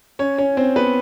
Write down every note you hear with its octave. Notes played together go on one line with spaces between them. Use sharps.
C#4 C#5
C#4 C#5
C4 C5
B3 B4